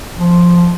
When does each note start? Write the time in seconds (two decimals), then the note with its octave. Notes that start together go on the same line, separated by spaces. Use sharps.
0.17 F3